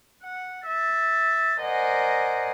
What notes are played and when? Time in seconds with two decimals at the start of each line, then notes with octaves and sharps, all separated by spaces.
0.23 F#5
0.66 E5 A6
1.59 A#4 C5 D5 D#5 F#5 G#5